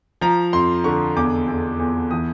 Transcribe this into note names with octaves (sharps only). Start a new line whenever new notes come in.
F3 A#5
F2 C6
D3 C#6
E2 D6
E2
E2
E3 D#6